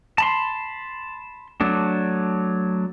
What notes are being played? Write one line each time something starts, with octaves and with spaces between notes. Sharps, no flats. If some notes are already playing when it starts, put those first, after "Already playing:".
A5 B5 C6
F#3 A3 D4